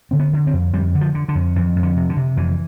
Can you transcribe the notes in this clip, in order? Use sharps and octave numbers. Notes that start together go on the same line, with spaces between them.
D3 C4
B3
D3
C4
F2
F2 G3
D3
F3
D3
D3
F2
F2 E3
F2
D3
C3
D3
C3
F2 E3